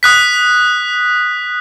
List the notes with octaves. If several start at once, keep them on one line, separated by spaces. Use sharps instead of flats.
D#6 F#6 B6